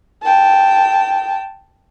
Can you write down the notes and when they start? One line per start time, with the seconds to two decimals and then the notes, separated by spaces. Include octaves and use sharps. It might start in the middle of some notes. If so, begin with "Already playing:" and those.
0.24 G5 A5